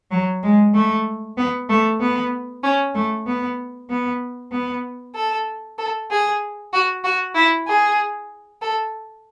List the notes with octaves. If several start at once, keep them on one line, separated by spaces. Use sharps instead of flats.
F#3
G#3
A3
B3
A3
B3
C#4
A3
B3
B3
B3
A4
A4
G#4
F#4
F#4
E4
G#4
A4